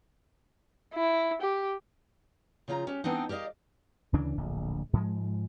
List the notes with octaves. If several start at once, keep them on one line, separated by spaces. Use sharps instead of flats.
E4
G4
C#3 F3 F4 C#5 A#5
C#4 G4
E3 B3 C4 D4 D#4
G4 A#4 D5 D#5 F5
D2 C#3 E3 D4
D1 A#1 D3
G#2 F3 G#3